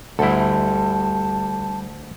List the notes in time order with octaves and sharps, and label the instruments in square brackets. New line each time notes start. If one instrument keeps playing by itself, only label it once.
[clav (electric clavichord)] D2 E4 [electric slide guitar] G3 A4 [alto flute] A5